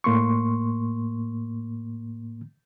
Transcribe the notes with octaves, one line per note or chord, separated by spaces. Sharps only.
A2 A#3 C6 C#6